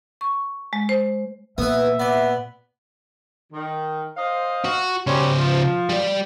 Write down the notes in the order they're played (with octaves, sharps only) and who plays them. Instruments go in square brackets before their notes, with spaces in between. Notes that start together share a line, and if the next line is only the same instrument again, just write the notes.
[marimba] C#6
G#3
C5
[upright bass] A#2 [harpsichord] B3 B4 [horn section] E5
[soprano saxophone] B3 [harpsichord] D5
[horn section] D#3
C5 D#5 F5
[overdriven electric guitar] F#4
[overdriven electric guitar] C#3 C5 [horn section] F#3 G3 C#4
[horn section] F3
[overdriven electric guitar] G3 D5